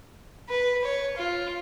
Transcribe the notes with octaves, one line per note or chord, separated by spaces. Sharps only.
B4
C#5
F4